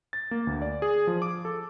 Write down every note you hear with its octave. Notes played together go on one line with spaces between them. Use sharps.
A6
A#3
D2
D5
G#4
F3
D6
A4